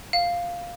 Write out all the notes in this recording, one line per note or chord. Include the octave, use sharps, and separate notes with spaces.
F5